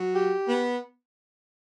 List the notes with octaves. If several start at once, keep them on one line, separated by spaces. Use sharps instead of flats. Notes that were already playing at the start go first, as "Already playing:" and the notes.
Already playing: F#3
G4
B3